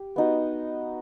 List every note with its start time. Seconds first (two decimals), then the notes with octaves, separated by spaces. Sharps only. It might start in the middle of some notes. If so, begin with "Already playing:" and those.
Already playing: G4
0.16 B3 D#4 F#4